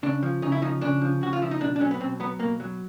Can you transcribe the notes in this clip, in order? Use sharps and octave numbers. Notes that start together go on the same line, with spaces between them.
C#3 D4
F3
C#3 D#4
E4
F3 D#4
C#3 D4
F3
C#3 F#4
F4
F3 E4
D#4
B2 D4
D4
F#3 C#4
B3
B2 C4
F#3 B3
B2 A#3
F#3